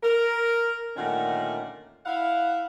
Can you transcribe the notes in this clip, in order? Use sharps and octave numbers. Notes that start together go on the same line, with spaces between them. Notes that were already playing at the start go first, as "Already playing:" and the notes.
A#4
A#2 D3 D#3 A3 C#4 F#5
E4 F5 F#5